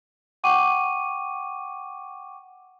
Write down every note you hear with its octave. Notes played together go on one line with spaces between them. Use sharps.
F#5 G5 C#6 D6 D#7